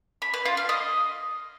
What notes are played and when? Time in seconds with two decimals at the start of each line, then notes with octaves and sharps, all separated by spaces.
0.22 B5
0.34 B4
0.45 F4
0.57 F5
0.69 D#5